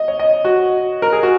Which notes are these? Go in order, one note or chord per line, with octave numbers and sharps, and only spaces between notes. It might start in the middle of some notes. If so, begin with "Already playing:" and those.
Already playing: D#5
C#5
D#5
F#4
A#4
G#4
F#4